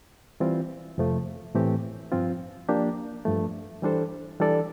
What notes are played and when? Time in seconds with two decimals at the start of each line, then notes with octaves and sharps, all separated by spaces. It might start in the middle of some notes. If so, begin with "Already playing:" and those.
0.40 E3 G3 C4 F4
0.98 F2 C3 F3 A3
1.55 A2 E3 A3 C4 G4
2.12 G2 F3 C4 F4
2.69 F3 A#3 D4 G4
3.25 G2 F3 A3
3.82 E3 G3 D4 A4 C5
4.40 E3 G3 D4 A4 D5